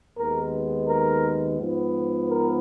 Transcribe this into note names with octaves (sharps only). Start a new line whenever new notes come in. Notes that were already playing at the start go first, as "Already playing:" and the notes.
D#2 D#3 G#3 B3 A#4
A#4
G#2 F3 B3
A#4